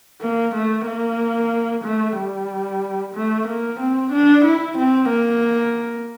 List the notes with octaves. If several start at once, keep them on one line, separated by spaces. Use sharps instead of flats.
A#3
A3
A#3
A3
G3
A3
A#3
C4
D4
E4
C4
A#3